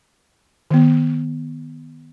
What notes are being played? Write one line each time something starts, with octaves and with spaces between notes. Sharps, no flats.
D#3 B3